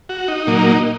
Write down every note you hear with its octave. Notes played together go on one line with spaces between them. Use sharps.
F#4
D#4
A#2 F#3 A#3